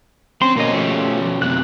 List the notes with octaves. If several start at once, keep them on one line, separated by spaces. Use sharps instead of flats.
C4 C#4 C6
B2 A#3 C#4 D#5
F3 A3 G4
F#2 C3 F#6